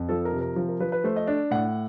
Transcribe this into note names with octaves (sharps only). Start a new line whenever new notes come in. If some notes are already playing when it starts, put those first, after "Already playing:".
Already playing: F2
F3 A4
A#4
C3
A#4
F3
A#4
F3 B4
B4
A3 C5
D#5
D4
A2 F#5